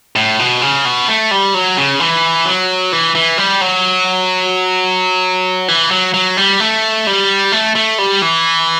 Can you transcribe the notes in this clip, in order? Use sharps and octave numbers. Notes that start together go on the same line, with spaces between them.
A2
B2
C#3
B2
A3
G3
F#3
C#3
E3
F#3
E3
E3
G3
F#3
E3
F#3
F#3
G3
A3
G3
A3
A3
G3
E3